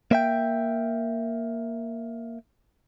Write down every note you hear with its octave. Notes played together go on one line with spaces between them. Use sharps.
A#3 E5 G5